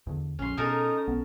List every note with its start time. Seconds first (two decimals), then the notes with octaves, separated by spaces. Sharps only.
0.07 E2 D3
0.39 A#1 F2 C#4 C6
0.57 B2 D#4 A4 A#4 G#5 D#6
1.08 B1 B3